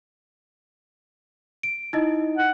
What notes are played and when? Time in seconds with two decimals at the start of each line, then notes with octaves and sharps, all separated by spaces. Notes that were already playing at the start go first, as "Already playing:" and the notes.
1.63 D7
1.93 D#4 E4 D#5
2.37 F#5